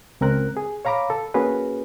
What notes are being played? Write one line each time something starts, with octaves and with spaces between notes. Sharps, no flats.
C#2 C4 A#4 F#6
G#4
C#5 F5 A#5 B5 D6
A4
A#3 C#4 F#4 G#4 B4